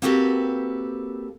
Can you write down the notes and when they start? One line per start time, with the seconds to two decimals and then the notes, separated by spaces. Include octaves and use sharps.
0.02 A#3 C4 F#4 G4 A4 B4